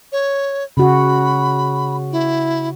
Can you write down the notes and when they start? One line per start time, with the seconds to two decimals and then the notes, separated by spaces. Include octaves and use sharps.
0.12 C#5
0.77 C#3 F#4 B5
2.12 E4